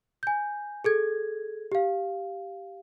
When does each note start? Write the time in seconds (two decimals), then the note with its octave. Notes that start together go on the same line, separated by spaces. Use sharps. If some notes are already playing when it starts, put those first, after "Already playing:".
0.23 G#5 G6
0.84 G#4 A4 G#6
1.72 G4 F5